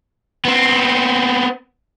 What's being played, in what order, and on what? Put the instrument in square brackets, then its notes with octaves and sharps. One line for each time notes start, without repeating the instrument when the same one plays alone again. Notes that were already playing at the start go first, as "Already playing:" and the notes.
[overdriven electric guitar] B3 C4